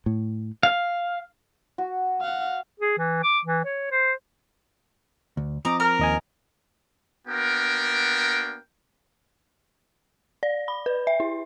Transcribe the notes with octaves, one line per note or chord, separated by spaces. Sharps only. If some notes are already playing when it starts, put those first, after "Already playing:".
A2
F5
F#4
F5 F#5
G#4
E3
D6
E3
C#5
C5
D2
F3 C4 D#5 A#5 D6
A#4 A#5 F6
D#2 D#5 G#5
A#3 B3 D4 F#4 A#4 G5
D5
B5
B4
E5
E4